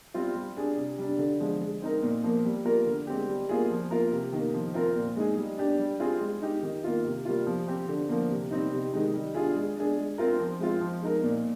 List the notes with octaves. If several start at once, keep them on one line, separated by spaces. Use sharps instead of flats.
G3 C4 F4
G3
D4 G#4
C3
G3 D4
D3
F3 G#3
G#3
C4 D#4 A#4
A#2
F3 A#3
G3
A#3 F4 A#4
D3
G#3 C4 G4
G3
A#3 F4 G#4
F3
A#3 F4 A#4
C3
D#3 A#3
F3
C4 F4 A#4
A#2
G#3 D#4 G#4
G3
D4 G4
G3
C4 F4 G#4
G#3
D#4 G4
D#3
A#3 F4
C3
G3 A#3 F4
F3
C4 G4
D3
F3 A#3
C3
G3 C4 D#4
C3
D#3 G#3 D#4
G3
D4 F4 G#4
G#3
D4 G#4
G#3
C4 F4 A#4
F3
G#3 C4 F4
F3
G#3 D#4 A#4
A#2